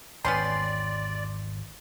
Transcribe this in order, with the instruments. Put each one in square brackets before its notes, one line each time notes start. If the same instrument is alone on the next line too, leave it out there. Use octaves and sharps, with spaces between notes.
[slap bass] G#1 E2 [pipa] B3 C#4 G4 [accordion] D5 [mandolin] C6